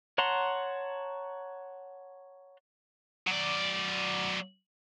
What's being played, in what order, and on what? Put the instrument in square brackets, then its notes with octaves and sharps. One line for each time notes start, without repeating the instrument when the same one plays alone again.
[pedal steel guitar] C#5 F#5 A5 A#5 C6
[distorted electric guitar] F#3 D5